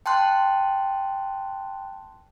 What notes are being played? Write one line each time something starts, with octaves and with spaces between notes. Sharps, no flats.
G5 A5 C6 F#6